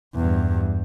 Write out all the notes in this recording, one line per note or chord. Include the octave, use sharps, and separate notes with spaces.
E2 G2